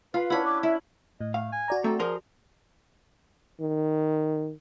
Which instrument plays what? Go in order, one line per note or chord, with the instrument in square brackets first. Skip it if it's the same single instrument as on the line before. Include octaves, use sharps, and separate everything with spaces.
[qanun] F4 [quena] B4 [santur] F5 B5
[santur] C#4 D4 E4 [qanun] F#5 B5
[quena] D6
[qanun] E4 [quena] E5 [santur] B5
[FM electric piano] A2 [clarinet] D#5
[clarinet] A3 [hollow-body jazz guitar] F5
[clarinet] G#5
[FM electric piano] F#4 D5 A#5
[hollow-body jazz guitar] A3 C4 [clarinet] A4
[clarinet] F3 [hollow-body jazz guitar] G#4 A#4 C6
[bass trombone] D#3